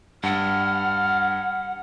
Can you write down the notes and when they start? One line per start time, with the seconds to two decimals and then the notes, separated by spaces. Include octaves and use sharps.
0.23 G2 F#5 F6